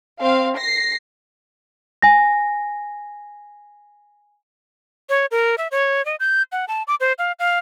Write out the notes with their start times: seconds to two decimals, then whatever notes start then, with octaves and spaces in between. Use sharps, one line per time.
0.21 C4 F5
0.57 A#6 C7
2.02 G#5 A#6
5.09 C#5
5.31 A#4
5.58 E5
5.71 C#5
6.05 D#5
6.20 G6
6.52 F#5
6.68 A5
6.87 D6
7.00 C5
7.18 F5
7.39 F5